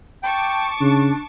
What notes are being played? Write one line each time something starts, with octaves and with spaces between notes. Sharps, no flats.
G5 A5 C#6 D6
C#3 D4